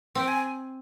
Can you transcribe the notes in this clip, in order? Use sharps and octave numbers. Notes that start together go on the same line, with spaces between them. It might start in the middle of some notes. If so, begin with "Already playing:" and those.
C4 G5
G#5